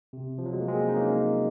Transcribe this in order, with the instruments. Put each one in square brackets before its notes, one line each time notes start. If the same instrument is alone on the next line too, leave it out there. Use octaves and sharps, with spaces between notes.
[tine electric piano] C3
F3
F#3
G#3
A#3
G#3 C4
D#4
A#3 C#4